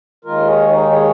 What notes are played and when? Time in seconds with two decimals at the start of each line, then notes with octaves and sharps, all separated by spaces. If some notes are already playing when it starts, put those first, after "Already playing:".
0.25 D#2 D#3 G#3 F4 A#4
0.47 G#4 C#5
0.69 D#4 G#4
0.91 G#4 C#5